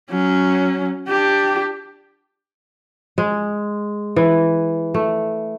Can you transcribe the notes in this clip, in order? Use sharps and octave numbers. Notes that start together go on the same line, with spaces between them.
F#3 C#4
D4 G4
G#3
E3
A3